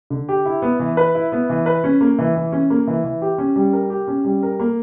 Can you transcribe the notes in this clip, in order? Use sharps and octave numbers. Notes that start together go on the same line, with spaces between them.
D3
G4
E4
B3
E3
B4
E4
B3
E3
B4
C#4
A#3
E3
E3
C#4
A#3
E3
E3
G4
C#4
G3
A#4
G4
C#4
G3
A#4
A#3